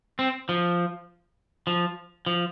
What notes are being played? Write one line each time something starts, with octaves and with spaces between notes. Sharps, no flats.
C4
F3
F3
F3